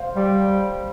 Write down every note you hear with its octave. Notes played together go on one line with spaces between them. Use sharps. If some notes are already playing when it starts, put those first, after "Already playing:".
Already playing: C5 F5
G3